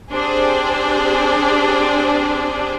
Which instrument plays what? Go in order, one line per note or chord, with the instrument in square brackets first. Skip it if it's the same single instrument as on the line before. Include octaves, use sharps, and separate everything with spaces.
[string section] C4 D4 G4 G#4 C5 D5